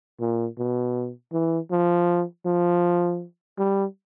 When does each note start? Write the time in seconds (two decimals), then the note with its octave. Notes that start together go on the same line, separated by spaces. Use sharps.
0.21 A#2
0.58 B2
1.33 E3
1.71 F3
2.46 F3
3.58 G3